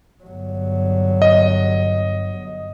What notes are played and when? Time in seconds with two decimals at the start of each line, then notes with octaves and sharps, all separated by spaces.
0.24 G1 F#3
1.22 D#5